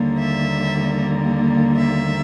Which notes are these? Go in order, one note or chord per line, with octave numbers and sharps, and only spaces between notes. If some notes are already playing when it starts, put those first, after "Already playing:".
Already playing: D#2 D3 G3 A#3
E5
E5